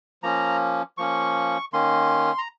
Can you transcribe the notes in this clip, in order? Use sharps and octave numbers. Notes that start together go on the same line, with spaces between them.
F3 A#3 C#4 A#5
F3 A#3 C#4 C#6
D#3 A#3 C#4 C6
A#5